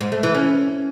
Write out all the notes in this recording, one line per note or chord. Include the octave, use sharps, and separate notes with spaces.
G#2
A3
E3
C#4